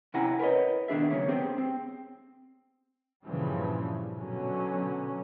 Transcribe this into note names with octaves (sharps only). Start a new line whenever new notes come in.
C3 C#4 E4 F#5 G#5 A#5
A#4 B4 C#5 D#5
B2 D#3 D4 G#4 E5
C#3 F#3 A#3 C#4
B3 C4 G4 G#4 C5
C4
G2 A#2 C#3 E3 F3 G3
B2 D3 F#3 C#4